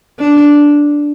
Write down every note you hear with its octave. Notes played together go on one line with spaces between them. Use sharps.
D4